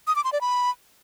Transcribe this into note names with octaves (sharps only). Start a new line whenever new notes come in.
D#6
D6
C6
D5
B5